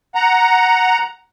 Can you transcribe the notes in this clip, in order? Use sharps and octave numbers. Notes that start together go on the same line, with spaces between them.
F#5 A#5